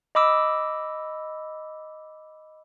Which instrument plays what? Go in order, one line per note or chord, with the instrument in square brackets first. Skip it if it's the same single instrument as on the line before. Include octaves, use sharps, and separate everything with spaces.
[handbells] D#5 B5 D6 E6